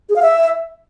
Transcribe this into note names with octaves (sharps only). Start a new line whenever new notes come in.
G#4
F5
E5